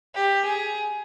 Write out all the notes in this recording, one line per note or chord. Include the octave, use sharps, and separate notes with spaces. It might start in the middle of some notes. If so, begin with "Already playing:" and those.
G4
G#4